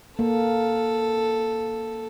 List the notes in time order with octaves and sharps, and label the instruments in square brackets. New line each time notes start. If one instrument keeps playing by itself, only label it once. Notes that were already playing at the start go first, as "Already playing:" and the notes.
[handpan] A#3 [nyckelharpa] A4